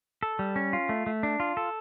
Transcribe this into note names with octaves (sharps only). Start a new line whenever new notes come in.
A4
G3
C#4
F4
A3
A3
D4
F4
A4